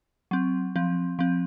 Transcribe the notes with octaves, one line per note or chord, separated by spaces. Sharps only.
F#3 C4
F3 C4
F3 C4